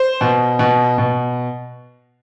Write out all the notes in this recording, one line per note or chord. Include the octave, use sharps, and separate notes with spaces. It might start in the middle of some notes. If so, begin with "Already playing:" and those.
Already playing: C5
B2
B2
B2